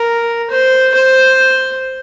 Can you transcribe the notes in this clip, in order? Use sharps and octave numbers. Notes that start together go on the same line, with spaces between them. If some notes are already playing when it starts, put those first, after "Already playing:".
Already playing: A#4
C5
C5